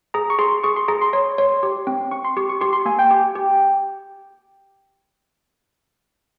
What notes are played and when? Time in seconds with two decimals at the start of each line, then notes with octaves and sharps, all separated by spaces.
0.14 G#4 A#5
0.30 C#6
0.39 G#4 C6
0.64 G#4 C#6
0.76 C6
0.88 G#4 A#5
1.01 C6
1.13 C#5 C6
1.38 C#5
1.63 G4
1.87 C4
2.11 C4 C#6
2.25 C6
2.37 G4 C#6
2.49 C#6
2.61 G4 C6
2.73 C6
2.86 A#3 G#5
2.99 G5
3.11 G4
3.36 G4